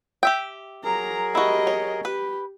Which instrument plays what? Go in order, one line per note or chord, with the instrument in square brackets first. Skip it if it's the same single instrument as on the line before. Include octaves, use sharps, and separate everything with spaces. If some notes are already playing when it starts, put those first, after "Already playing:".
[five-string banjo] G4 E5 G5
[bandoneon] F#3 G#4 A#4 [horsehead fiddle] A#5
[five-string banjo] E4 F#4 [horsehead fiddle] G4 D#5
[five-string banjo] C#5
[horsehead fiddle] G4 [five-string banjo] B4